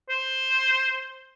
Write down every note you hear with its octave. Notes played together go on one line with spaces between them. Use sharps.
C5